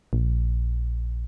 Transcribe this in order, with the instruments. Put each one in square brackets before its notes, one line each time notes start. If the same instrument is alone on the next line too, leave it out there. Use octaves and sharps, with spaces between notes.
[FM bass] A#1